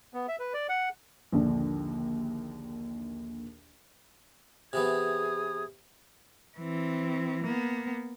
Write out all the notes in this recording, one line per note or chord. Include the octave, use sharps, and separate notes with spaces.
B3
E5
B4
D5
F#5
A#1 D#2 D3
C3 E3 B3 G#4 D#6 G#6
E3 C4
A#3 B3